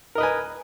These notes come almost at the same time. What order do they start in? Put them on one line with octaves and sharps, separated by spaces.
A#4 D#5 B4 G#5